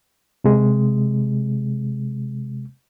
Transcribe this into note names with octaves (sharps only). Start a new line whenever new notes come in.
C3 G#3